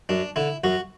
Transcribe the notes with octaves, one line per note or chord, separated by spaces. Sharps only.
F#2 D4
D3 E4
F#2 F#4